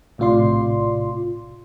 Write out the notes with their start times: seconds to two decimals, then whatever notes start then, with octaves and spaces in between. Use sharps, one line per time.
0.18 A#1 A2 C3 F4 D5 C6